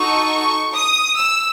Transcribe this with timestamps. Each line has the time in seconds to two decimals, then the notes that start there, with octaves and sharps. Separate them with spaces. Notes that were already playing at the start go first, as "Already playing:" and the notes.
Already playing: D#4 F#4 A4 C#6
0.73 D#6
1.17 E6